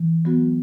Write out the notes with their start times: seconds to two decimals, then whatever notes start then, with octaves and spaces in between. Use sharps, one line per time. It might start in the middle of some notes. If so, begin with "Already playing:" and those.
Already playing: E3
0.25 F#3 B3 F#4